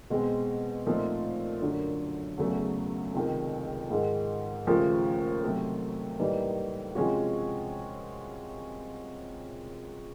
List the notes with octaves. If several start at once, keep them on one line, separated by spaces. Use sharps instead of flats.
B2 G#3 C4
A#2 F3 A3 C4 D#4
F#2 D3 F#3
E2 C#3 F#3 A3
C#2 C3 D#3
G#2 D#3 G#3
D#2 C#3 F3 A3
C3 D#3 F#3 A3
A2 E3 G3 A#3 D#4
C3 F3 G#3 C#4 F#4